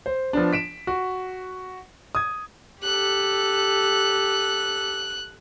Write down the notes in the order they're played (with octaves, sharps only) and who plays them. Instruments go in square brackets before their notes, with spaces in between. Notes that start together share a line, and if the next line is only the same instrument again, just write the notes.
[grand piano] C5
F3 B3 D4
B6 D7 E7
F#4
D#6 G#6
[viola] G4 A4 [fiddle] F#6